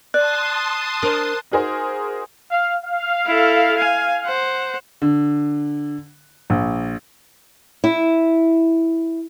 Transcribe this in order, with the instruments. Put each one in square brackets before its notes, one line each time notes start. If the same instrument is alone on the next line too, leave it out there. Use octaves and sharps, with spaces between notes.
[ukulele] D5 [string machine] A5 C6 D#6 [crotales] F#6
[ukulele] D4 [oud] A#4 C5
[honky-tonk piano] D#4 F#4 G#4 A#4 C5
[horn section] F5
F5
[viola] E4 A4
G#5
C5 F#5
[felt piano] D3
A#1
[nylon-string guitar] E4